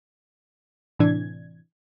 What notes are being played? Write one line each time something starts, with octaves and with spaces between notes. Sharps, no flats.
A2 C3 E3 D4 G#6